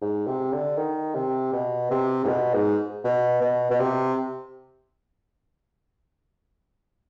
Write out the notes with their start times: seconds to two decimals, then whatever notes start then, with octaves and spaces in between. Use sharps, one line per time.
0.02 G#2
0.27 C3
0.53 D3
0.78 D#3
1.15 C3
1.53 B2
1.91 C3
2.25 G#2
2.28 B2
2.54 G#2
3.04 B2
3.41 B2
3.71 B2
3.80 C3